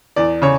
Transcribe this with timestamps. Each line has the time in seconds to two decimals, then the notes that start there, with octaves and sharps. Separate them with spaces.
0.16 E2 D5
0.42 C#3 C#5